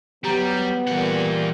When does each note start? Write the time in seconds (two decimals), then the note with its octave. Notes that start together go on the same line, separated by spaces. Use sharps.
0.24 F#3 G3 B3 G4 A#5
0.87 A#2 E3 G3 A#3 F#5